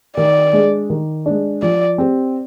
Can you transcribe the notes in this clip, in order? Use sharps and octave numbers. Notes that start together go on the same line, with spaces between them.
D#3 D5
G#3 D4 G#4
D#3
G#3 D4
F3 D5
C4 G4